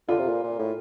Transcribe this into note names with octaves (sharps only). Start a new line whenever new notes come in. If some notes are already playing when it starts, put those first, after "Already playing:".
D3 F4
C3
A#2
A#2
A2